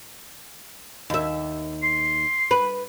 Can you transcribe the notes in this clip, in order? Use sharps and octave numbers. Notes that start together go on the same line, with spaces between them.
D#2 E5
C6
B4